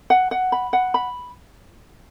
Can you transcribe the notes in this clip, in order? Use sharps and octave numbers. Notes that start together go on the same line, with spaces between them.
F#5
F#5
B5
F#5
B5